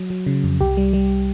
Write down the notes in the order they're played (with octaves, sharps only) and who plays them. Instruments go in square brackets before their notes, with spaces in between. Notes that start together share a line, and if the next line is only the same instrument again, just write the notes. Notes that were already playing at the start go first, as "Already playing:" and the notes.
Already playing: [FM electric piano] F#3
F#3
C#3
F2
C2 G4
G3
G3